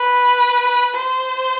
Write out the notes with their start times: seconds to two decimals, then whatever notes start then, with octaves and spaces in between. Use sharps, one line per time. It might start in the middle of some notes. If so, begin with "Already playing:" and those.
Already playing: B4
0.94 C5